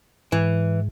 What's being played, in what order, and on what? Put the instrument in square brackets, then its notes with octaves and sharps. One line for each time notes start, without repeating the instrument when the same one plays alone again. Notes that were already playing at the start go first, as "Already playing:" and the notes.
[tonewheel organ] G#2 [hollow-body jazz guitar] E3